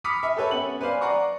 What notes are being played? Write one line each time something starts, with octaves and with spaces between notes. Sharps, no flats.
B5 D6 D#6 F6 B6 C#7
E5
G4 A4 B4 C#5 E5
B3 C#4 F#7
B4 C5 D5 F5 G#5
D5 F#5 A#5 C#6